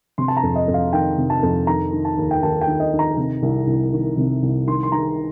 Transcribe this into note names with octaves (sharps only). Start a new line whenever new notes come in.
C3 C6
A5
A#5
F2
D#5
F2
F5
D#3 G5
C3
A5
F2
D#3 A#5
D#3
A5
D#2
G5
D#2 A5
G5
D#3
D#5
D#3
A#5
C3
C2
C2
D#3
C3
C2
D#3 C6
C6
D#3 A#5